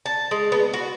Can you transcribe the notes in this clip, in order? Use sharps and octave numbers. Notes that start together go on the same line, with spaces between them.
A5
G#3
B3
F#4